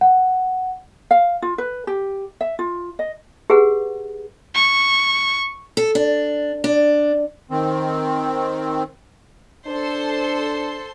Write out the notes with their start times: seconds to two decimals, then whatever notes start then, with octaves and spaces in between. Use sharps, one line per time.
0.01 F#5
1.11 F5
1.42 F4
1.58 B4
1.87 G4
2.41 E5
2.59 F4
2.99 D#5
3.50 G4 G#4 B4 F#5
4.55 C#6
5.77 A4
5.95 D4
6.64 D4
7.51 D#3 C4
9.67 D4 A4 C5 C6